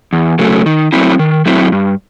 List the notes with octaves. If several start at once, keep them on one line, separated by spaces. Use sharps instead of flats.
E2
C#3 F#3 A3
D#3
F#3 A3 C4 E4
D#3
F#3 A3 C4 E4
G2